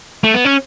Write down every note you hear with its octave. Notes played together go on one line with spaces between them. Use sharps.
A3
B3
C#4